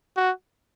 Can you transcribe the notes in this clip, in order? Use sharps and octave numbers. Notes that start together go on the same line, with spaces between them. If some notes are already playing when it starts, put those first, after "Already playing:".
F#4